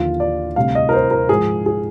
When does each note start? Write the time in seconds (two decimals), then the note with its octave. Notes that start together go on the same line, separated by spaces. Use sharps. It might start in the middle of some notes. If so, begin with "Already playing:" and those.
Already playing: D#2 D3 F3 F4
0.20 D5
0.56 D2 C3 G3 F5
0.75 D#5
0.89 A#4
0.93 C5
1.11 A#4
1.29 G#2 F3 G#4
1.66 G#4